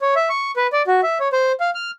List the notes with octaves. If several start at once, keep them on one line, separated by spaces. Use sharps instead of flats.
C#5
E5
C#6
B4
D5
F#4
E5
C#5
C5
F5
F6